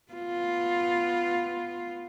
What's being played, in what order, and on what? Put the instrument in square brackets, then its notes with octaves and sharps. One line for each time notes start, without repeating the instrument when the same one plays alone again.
[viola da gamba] B3 F4